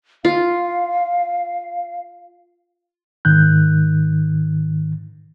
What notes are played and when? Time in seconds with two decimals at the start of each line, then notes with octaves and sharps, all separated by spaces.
0.25 F4 F5
3.25 G#2 D#3 F#6 G6